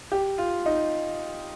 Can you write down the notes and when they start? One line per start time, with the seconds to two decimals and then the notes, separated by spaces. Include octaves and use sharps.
0.12 G4
0.38 F4
0.66 D#4